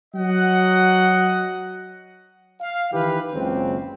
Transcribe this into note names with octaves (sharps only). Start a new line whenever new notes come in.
F#3 D#5 F#5
F5
D#3 E3 G4 B4
F#1 C#2 C4